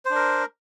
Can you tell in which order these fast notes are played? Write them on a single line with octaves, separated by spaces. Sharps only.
C5 D4 A#4